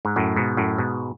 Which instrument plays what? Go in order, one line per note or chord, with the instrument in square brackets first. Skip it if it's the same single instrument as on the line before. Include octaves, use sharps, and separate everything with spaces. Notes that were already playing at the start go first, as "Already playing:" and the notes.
[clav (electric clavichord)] G#2
F#2 A2
G#2 B2
F#2 A2
G#2 B2